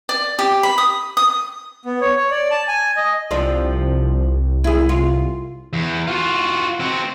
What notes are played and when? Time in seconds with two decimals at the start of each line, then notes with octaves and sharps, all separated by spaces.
0.09 D5
0.39 G4
0.63 B5
0.78 D#6
1.17 D#6
1.85 B3
2.01 C#5
2.16 C#5
2.31 D5
2.51 A5
2.68 G#5
2.97 D#5
3.31 C2 F3 C4 D4
4.64 E4 G#4
4.89 F4
5.73 E2
6.08 F4 F#4
6.80 C4 F#4